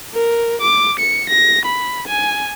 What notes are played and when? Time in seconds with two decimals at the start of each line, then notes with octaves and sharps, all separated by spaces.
0.14 A#4
0.61 D6
0.99 C#7
1.30 A#6
1.65 B5
2.08 G#5